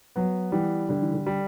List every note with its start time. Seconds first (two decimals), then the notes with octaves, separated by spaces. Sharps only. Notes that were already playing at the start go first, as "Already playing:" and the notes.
0.16 F#3 B3
0.52 E3 G3
0.89 D3 G3
1.02 E3
1.14 D3
1.27 G3